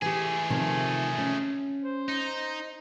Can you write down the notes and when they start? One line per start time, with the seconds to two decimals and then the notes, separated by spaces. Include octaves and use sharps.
0.02 E3 A3 G4 G#4 G#5
0.50 C3 D#3 F3
1.18 C#4
1.83 C5
2.09 D#4